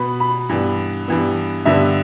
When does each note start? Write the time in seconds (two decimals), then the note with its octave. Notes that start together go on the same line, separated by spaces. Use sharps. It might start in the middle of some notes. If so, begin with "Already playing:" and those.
Already playing: B2 B3 B5
0.20 B5
0.49 G2 E3 B3
1.08 G2 E3 B3
1.65 G2 D3 B3 E5